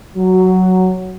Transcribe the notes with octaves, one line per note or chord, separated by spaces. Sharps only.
F#3